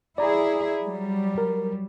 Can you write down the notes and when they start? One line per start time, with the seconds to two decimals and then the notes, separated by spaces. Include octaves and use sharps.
0.18 E4 G#4 D5 A#5
0.81 F#3 G3
1.38 A#4